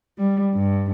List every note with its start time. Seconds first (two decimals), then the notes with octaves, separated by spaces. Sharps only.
0.20 G3
0.55 G2